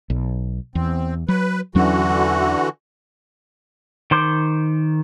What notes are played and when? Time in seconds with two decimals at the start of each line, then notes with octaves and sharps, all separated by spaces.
0.10 B1
0.75 E2 C4
1.28 F#3 B4
1.75 E2 D3 E3 F#3 C#4 F#4
4.11 D#3 C5 C6 D6 G6